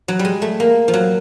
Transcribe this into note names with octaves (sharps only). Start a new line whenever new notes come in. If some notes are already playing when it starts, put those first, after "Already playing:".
F#3
G3
G#3
A3
A#3
F3
F#3